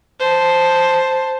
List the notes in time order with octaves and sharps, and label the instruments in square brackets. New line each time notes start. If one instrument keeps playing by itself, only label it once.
[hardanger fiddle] C5 A5